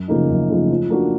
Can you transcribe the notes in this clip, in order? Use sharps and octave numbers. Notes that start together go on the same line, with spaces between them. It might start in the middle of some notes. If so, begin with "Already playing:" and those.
Already playing: F#2
C#3 F3 A#3 D#4
F#2
C#3 F3 A#3 D#4
F3
A#3 D4 F#4